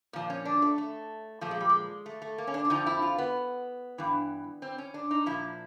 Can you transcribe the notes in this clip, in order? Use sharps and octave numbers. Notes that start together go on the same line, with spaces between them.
A#2 F3
C#4
D4
A3
A3
A#2 F3 A3
G#3
G3
G#3
A3
A3
A#3
C#4
D4
D4
F2 D3 F3 D#4
E4
F4
B3
G2 E3
C4
C#4
D4
D#4
A#2 F3 E4